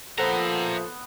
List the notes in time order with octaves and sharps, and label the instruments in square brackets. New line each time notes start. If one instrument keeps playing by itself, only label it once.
[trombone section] A#2 F3 [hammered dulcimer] B3 F#5 [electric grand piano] A4 C5 [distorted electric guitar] E5 A#5